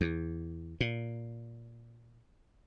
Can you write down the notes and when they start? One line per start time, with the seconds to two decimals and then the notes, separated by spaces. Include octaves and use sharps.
0.01 E2
0.81 A#2